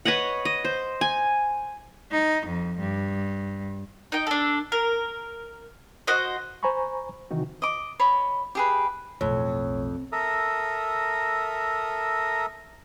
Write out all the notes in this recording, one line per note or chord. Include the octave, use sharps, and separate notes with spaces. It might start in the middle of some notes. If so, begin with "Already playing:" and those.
B4 C#5 D#5 F#5
D#5
C5
G#5
D#4
F2
G2
D#4 D#5 G5
D4 A4
A#4
F#4 C5 D#5
C5 G#5 A#5 B5 C#6
C3 D#3 E3 D#4 F#4
D#5 D6
C#5 D#5 B5
G4 G#4 B4
B1 F2 A2 C#5
A4 A#4 E5 A#5 D#6